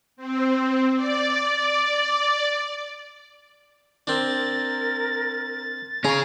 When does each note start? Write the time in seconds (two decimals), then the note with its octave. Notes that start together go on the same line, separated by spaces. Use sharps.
0.16 C4
0.95 D5
4.07 C4 D4 A#4 A6
6.04 C#4 G#4 C#5 A#5